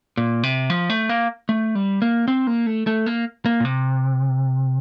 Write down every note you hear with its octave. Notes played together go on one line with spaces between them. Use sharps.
A#2
C3
F3
A3
A#3
A3
G3
A#3
C4
A#3
A3
A3
A#3
A#3
A#2
C3